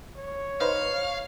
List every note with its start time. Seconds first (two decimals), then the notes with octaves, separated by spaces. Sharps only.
0.17 C#5
0.61 D#4 B4 C5 F5